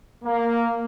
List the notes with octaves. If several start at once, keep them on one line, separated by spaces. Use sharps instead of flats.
A#3